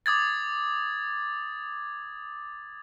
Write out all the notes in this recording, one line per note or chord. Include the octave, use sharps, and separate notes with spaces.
D6 D#6 G#6 A6